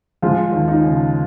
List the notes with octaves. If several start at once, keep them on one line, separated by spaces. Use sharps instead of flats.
F3 G#3 F4
D#2
D#4
C#3